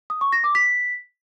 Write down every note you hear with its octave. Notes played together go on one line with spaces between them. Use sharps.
D#6
C#6
A#6
D6
B6